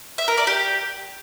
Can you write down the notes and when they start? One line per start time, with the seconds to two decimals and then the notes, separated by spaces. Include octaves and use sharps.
0.18 E5
0.28 A#4
0.37 D5
0.47 G4